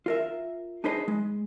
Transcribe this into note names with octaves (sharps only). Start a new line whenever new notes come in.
F4 A#4 E5
D4 D#4 G#4 B4 C5 D#5
G#3